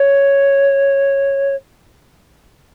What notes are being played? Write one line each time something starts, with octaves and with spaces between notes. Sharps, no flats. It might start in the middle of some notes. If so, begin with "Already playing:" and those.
Already playing: C#5